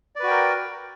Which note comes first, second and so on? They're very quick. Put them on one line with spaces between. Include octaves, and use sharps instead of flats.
D5 B4 F#4 G5 A#4